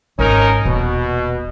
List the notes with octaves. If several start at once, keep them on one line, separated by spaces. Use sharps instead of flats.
G#1 C#4 D#4 A#4
D#1 B2